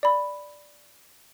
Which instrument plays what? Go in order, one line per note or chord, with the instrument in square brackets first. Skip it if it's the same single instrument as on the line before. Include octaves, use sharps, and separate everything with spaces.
[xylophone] D5 B5